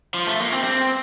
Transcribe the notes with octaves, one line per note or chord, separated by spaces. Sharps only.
F3
A3
A#3
C4
C4